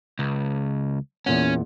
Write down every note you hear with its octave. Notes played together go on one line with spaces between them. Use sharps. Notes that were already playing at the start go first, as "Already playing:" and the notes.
C#2
E2 A#2 C#4 F#5